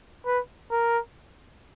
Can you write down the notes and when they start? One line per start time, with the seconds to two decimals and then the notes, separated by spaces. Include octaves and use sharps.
0.26 B4
0.71 A#4